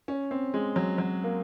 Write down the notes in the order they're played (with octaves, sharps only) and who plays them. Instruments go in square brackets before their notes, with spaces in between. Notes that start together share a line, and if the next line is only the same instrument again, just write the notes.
[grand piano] C#4
C4
G#3
F#3
F#3
A#3